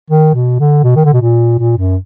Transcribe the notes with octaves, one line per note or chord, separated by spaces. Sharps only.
D#3
B2
D3
B2
D#3
D3
B2
A#2
A#2
F#2